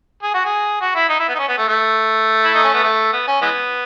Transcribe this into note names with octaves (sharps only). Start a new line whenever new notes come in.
G#4
F#4
G#4
F#4
E4
D#4
E4
B3
D#4
C#4
B3
A3
A3
E4
D#4
C#4
B3
A3
B3
C#4
E3 G#3 B3